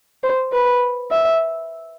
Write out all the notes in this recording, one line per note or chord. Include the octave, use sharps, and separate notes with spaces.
C5
B4
E5